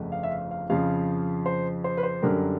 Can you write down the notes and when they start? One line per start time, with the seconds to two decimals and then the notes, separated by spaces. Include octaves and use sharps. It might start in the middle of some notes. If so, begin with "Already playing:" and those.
Already playing: G1 F2 C#3 A3
0.12 F5
0.23 E5
0.31 F5
0.51 F5
0.70 F2 C#3 F3 F5
1.46 C5
1.84 C5
1.97 B4
2.03 C5
2.22 F#2 D3 G3 A#4